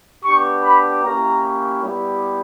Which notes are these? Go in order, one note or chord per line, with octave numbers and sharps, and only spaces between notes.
B3 D4 G4 C#6
B5
A#3 C#4 E4 G4 A#5
G3 B3 E4 G4